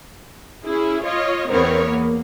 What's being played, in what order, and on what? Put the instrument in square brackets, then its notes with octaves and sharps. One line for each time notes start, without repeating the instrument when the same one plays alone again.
[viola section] C#4 E4 G#4
F4 C#5 D#5
[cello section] E2 B3 [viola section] C4 A#4 C#5
[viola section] A#3